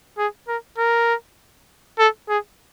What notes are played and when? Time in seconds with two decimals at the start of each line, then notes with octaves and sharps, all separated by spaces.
0.18 G#4
0.48 A#4
0.78 A#4
1.99 A4
2.29 G#4